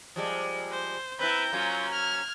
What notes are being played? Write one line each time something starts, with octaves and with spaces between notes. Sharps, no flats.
F3 G3 G#3
C5
C4 E4 B4 A#5 G6
F#3 A#3 C#4 F4
F6 G#6